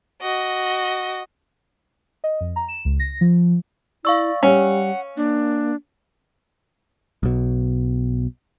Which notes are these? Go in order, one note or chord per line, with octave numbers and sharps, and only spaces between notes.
F#4 D#5
D#5
F2
A#5
E7
C#2
A#6
F3
E4 D5 F5 C#6 E6
G3 C#4 F#5
A#3 D4
B1 B2